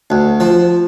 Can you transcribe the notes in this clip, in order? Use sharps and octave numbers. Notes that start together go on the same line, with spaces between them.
D2
F3